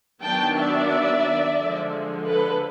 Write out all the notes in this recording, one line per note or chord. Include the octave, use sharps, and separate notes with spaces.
D#3 F#3 B3 D4 G5 A5
D5 E5
D3 F3 G#3
A4 B4